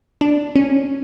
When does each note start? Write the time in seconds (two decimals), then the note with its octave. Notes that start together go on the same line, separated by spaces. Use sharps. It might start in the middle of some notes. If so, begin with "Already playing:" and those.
0.21 D4
0.55 C#4